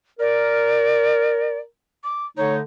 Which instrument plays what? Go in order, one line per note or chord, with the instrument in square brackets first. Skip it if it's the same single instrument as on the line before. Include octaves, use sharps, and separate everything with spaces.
[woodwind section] A#4 [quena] D5
[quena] D6
[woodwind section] D3 A3 D#4 [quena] C#5